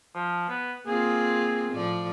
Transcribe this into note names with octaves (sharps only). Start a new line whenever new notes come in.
F3
B3
A#3 C4 F4 G#4
A2 F3 D5